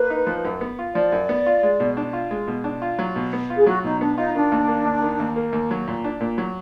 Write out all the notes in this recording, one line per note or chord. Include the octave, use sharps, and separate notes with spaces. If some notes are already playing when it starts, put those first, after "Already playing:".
Already playing: A#3 B4
D#4
F3
F#2
B3
F4
F3 D5
F#2
B3
F4
G#3
B2
D4
F4
G#3
B2
D4
F4
F#3
B2
B3
F4
G#4
F#3 F#4
B2 D#4
B3 D4
D#4 F4
D#3 D4
D#2
A#3
D#2
D#3
D#2
A#3
D#2
F#3
A#2
D4
A#2
F#3